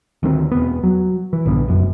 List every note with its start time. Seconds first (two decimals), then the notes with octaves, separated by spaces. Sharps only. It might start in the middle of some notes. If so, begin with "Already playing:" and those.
0.23 D2 D#3 A3 C4
0.51 E1 B3
0.84 F#3
1.33 E3
1.46 A#1 G2 D3 B3
1.68 F1 F#2